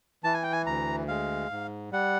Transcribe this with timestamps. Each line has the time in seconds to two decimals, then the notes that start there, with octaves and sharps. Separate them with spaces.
0.24 E3 A5
0.34 G#5
0.43 G5
0.52 G#5
0.66 D2 A#5
1.08 G#3 F5
1.51 G#2
1.92 G3 F#5